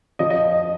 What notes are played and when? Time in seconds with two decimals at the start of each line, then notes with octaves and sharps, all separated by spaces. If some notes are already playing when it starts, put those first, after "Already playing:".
0.19 F3 D#5
0.30 D#5